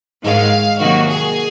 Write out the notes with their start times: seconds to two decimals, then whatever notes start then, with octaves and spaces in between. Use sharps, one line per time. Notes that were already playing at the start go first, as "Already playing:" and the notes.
0.23 G#2 D#3 G#3 F5
0.80 C3 D#3 F#3 A#3 F#4
1.08 G#4